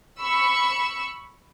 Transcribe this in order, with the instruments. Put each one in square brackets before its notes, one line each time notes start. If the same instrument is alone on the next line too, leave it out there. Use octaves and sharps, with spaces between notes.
[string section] B5 C#6 E6